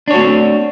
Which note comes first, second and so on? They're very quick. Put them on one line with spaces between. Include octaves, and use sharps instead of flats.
D4 C#5 F#4 A3 C4